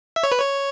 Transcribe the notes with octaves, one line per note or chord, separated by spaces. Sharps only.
E5
C#5
B4
C#5